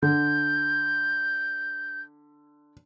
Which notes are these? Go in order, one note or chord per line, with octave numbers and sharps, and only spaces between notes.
D3 G6